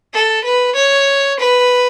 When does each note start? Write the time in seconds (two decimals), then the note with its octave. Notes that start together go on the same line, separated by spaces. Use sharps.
0.14 A4
0.45 B4
0.76 C#5
1.40 B4